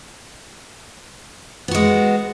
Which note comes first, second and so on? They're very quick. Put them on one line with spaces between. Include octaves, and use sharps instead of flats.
B3 F#4 G#3